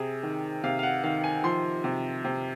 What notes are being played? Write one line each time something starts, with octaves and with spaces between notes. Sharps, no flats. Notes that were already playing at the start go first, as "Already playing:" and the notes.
Already playing: C3 G#4
D#3
C3 F5
F5
F#5
D#3 F5
G#5
F3 C6
C3
C3